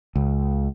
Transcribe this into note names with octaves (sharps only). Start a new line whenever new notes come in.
C#2